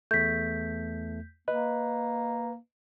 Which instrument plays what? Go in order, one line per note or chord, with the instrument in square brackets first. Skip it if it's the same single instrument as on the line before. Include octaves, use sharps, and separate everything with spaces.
[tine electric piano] E2 A3 [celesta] G6 B6
[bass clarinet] A#3 [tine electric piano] B4 [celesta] D#5